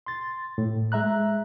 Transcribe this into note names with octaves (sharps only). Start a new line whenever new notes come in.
C6 A6
A2
G#3 E5 A#5 F#6